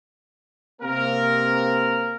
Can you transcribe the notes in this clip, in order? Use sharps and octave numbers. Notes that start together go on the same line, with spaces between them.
C3 A#3 C4 A#4